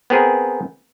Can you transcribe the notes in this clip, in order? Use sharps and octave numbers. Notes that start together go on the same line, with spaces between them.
B3 C4 G#4 A#4 G#5